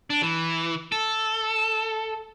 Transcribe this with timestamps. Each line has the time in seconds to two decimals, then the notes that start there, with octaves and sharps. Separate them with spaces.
0.10 D4
0.22 E3
0.92 A4